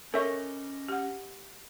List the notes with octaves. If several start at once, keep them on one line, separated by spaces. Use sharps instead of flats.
C#4 A4 A#4 C#5 D#5 E5 C#6
G4 F#5